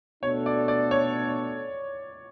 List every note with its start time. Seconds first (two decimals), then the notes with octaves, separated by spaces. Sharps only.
0.23 B2 A3 D4 F#4 A4 C#5
0.46 D5
0.68 D5
0.91 C#5